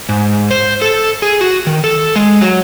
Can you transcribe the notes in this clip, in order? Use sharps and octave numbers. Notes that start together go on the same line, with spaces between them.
G#2
C5
A4
G#4
F#4
D#3
A4
G#3
F#3